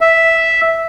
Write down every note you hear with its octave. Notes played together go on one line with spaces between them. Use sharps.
E5